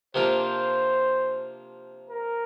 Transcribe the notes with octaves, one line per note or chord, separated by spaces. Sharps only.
C3 F3 A#3 D4 F4 C5
A#4